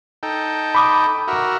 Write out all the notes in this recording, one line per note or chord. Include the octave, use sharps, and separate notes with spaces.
D#4 A4 G5
B5 D6 D#6
F#4 A#4 E5